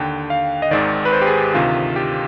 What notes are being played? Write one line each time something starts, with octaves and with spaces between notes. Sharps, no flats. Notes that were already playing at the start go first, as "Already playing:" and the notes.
Already playing: D#2 D3 G5
F5
D#5
G#1 G#2 D#3 D5
B4
C5
G4
G#4
G4
D2 C3 D#3 F4
G4